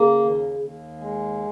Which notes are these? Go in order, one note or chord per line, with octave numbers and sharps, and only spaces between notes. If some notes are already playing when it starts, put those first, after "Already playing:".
Already playing: C#3 A#3
D#2
D#2
G#3